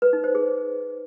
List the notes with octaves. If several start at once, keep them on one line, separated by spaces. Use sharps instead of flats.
B4
D#4
C5
G#4